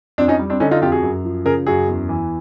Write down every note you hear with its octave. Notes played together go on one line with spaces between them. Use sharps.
F2 C4 D4
C#4 D#4
G3
C4 D4
D3 C#4 D#4
D#4 F4
F2 F4 G4
F#4 G#4
F#2
F3
C#3 G#4 A#4
F#2 F#4 G#4
E2
E3